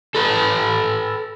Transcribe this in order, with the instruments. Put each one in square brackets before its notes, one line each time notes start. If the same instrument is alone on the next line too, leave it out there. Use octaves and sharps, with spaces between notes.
[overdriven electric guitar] A4 B4